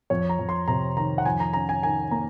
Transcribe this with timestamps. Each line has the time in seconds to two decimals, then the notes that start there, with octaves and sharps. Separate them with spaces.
0.10 F2 C#5
0.29 A#5
0.39 F2
0.49 C6
0.68 C3 A#5
0.97 D#3 A#5
1.18 F#5
1.25 F2 G#5
1.40 A#5
1.53 C#4 A#5
1.69 G#5
1.83 D#3 G#5
2.11 A#3 A#5